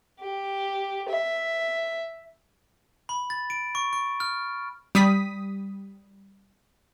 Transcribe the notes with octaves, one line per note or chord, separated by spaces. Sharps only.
G4
E5
B5
A6
D7
C#6
C#6
F6
G3 D#6 B6